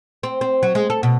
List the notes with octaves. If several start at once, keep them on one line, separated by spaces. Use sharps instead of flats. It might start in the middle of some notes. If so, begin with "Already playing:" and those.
C4
C4
F#3
G#3
A4
B2